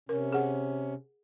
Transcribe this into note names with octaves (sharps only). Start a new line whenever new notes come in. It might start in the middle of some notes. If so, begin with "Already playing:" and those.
C3 C#4 A#4
G#4 F#5